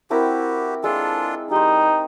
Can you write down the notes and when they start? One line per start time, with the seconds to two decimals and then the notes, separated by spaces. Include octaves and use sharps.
0.10 C4 E4 F#4 G4 A#4
0.84 G#3 D4 F4 A4
1.51 G3 D#4 G4 C5